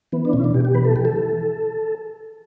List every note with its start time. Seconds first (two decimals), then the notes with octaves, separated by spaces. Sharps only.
0.12 E3 B3
0.25 D4
0.33 B2 C#4
0.40 E4
0.44 D4
0.54 B2 G4
0.65 G4
0.74 E3 B4
0.84 A4
0.96 E3 G4
1.05 A4
1.16 E3